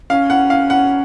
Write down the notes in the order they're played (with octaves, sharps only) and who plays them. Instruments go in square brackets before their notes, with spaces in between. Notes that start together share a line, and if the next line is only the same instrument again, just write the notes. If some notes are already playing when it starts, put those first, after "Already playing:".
[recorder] C#4 [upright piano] F5
[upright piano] F#5
F5
F#5